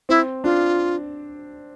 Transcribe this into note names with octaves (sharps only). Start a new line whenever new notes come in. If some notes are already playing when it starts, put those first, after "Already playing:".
C4 E4
D4 F4